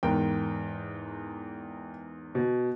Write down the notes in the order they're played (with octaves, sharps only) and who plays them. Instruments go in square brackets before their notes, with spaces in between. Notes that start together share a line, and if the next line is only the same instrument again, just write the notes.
[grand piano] E2 G#2 A#4 [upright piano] G5
[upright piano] B2